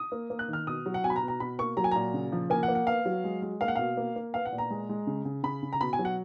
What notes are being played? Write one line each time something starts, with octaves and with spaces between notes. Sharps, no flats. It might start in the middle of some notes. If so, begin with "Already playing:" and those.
Already playing: D#6
A#3
A#3
F#6
D#3 F6
B2 D#6
F#3
F#5
B2 G#5
B5
A#5
B2
A#5
B2 B5
A#3 C#6
F#3 A#5
G#5
A#2 A#5
C#3
F3
A#3 G#5
F#5
A#3
F#5
B3 F5
F#3
G#3
G#3
A#3 F5
F#5
B2 F5
A#3
A#3
B3 F5
F#5
A#2
A#5
G#3
G#3
C#3
C#3
C#3 B5
C#3
A#5
B2 B5
G#5
F#3
F#5